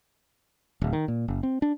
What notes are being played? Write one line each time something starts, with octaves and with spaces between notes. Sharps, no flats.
D1
D#3
A#2
F#1
C4
D4